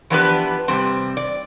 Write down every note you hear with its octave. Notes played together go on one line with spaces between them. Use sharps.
E3 F3 B3 D4 G4 B4
C3 G3 C4
D5